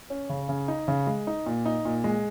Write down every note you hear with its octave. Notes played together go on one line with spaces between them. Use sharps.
C#4
C#3
C#3
D#4
C#3
G#3
D#4
A#2
D#4
A#2
G#3